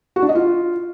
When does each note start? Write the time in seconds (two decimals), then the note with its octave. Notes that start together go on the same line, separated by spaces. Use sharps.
0.16 F#4
0.22 D4
0.29 D#5
0.35 F4